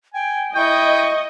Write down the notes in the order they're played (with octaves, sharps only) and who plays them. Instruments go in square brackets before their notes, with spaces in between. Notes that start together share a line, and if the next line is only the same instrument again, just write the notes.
[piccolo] G5 [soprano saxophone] G#5
[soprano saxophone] E4 [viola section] D#5 [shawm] G5 [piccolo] C#6